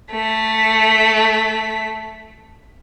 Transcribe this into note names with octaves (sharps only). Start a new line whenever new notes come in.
A3 B6